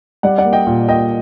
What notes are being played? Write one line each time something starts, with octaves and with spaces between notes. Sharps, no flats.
G3 D5 F#5
D5 F#5
A#3
D#5 G5
A#2
A#2 D#5 G5